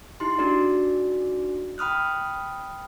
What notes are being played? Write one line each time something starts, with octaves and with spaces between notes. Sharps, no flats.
D#4 E4 G4 C6
D4 D#4 F#4 G#4 D5
G5 B5 D#6 F6 F#6